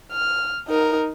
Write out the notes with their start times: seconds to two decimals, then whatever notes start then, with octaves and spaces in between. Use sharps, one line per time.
0.12 F6
0.68 D#4 A#4